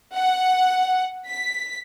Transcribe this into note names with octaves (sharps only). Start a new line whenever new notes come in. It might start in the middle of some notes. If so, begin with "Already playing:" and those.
F#5
B6